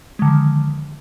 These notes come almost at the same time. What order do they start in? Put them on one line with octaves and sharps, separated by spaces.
G#3 D3 D#3 F3